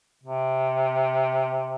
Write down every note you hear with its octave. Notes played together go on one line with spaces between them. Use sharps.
C3